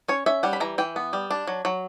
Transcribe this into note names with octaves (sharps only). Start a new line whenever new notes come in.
C#4 C#5
C#4 E5
G3 F#5
B5
E3 A#5
E3 G5
B3
G3
D4
F#3
F#3